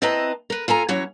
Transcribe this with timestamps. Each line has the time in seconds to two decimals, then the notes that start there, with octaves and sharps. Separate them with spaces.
0.02 C4 E4 B4 D#5 A5 A#5
0.50 A#4 B4
0.68 F4 A4 G#5 A#5
0.89 E3 F#3 C#4 C#5